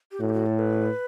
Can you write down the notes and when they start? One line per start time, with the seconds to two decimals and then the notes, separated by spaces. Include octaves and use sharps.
0.12 G4
0.20 A2 F#4
0.29 G4
0.33 F#4
0.46 A4
0.59 B4